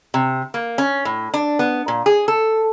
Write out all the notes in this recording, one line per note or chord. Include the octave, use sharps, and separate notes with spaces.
C3
A#3
C#4
A2
D4
B3
A#2
G#4
A4